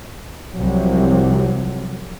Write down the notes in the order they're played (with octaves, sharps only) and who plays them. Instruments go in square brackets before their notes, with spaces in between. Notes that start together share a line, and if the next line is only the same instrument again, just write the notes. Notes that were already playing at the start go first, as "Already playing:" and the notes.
[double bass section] C2 C3 F3 F#3